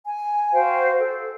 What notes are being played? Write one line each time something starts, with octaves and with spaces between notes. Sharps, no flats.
G#5
F#4 C5 F5 G5
A4